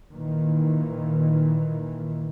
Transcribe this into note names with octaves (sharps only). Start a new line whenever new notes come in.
A#2 D#3 E3